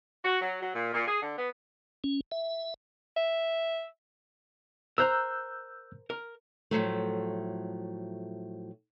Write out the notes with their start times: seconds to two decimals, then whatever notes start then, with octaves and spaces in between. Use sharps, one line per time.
0.25 F#4
0.41 F#3
0.62 F#3
0.74 A#2
0.93 A#2
1.07 G#4
1.21 D3
1.38 B3
2.04 C#4
2.32 E5
3.17 E5
4.98 A#4 C5 A#5 E6 F#6 G6
6.10 A#4
6.71 A2 F3 F#3 A3